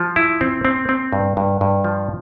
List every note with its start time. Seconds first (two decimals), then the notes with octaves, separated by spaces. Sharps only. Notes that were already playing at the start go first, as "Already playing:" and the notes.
Already playing: F3
0.16 E4
0.41 C4
0.65 C4
0.89 C4
1.13 G2
1.37 G2
1.61 G2
1.84 F3